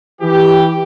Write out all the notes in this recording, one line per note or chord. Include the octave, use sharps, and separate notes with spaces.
E3 G4